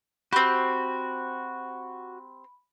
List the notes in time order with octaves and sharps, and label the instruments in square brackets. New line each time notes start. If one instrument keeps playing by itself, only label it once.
[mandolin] C4 G4 [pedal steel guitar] F#4 [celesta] B5